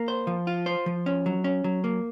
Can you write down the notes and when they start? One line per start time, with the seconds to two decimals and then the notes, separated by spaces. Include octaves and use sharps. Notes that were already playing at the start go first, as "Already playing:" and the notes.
Already playing: A#3
0.08 C5
0.27 F3
0.47 F4
0.66 C5
0.86 F3
1.06 C#4
1.26 F#3
1.44 C#4
1.64 F#3
1.84 A#3